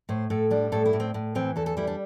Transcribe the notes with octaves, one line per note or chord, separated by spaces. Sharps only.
A2 C5
A2 A4
G3 D4
A2 A4
E4
A2
C4
A2
E3 C4
E2 A4
A4
G3 E4
D4